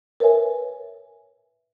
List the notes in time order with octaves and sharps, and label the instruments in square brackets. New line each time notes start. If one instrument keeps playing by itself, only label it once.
[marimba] A#4 B4 C#5 E5 G#5